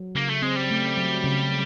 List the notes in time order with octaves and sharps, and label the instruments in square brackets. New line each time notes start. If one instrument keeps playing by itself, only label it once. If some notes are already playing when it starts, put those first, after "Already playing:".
Already playing: [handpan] F#3
[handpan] C#3 [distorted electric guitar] A#3
[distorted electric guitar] A3
[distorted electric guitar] G#3 [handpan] C4
[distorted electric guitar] G3
[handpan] A3
F#3
C#3